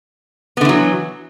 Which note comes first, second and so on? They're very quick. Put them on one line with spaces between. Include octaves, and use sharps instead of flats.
B3 D3 E3 F#3